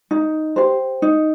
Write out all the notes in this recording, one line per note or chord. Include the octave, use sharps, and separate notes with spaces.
D#4
G4 C5
D#4